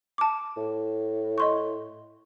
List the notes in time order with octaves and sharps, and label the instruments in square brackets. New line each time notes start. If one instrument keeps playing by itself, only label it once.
[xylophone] A5 D6
[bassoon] A2
[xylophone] D#5 C6 C#6